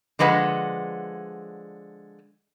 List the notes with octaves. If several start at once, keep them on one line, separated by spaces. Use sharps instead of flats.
D3 F3 G#3 B4 F#5